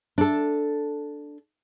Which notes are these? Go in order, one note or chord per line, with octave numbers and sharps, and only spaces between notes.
D4 A4